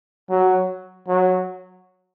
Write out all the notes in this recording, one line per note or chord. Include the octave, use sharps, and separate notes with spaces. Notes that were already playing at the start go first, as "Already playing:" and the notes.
F#3
F#3